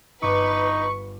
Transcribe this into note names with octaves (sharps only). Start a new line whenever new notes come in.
G1 D#4 B4 C#6 D6